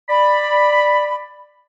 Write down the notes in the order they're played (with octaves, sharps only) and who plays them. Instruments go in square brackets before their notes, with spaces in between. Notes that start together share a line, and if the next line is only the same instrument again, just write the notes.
[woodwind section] D5 B5